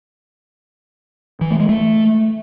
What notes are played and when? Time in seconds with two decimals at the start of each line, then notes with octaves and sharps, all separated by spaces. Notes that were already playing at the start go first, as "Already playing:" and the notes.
1.41 E3
1.50 A3
1.60 G#3
1.69 A3